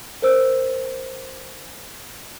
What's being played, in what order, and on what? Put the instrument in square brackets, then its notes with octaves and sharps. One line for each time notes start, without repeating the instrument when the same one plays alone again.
[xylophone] A#4 C5 E6